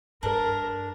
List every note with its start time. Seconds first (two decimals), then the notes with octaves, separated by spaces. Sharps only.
0.23 G2 D4 A#4